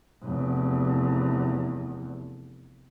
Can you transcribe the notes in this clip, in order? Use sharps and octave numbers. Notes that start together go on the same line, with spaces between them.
F1 E2